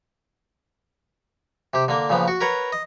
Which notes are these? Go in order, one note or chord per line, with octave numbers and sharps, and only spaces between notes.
C3 G4
D3 A#3
A#2 C#3 F3 B3
F#4 C#6
A#4 B4 C#5 F#5
D#5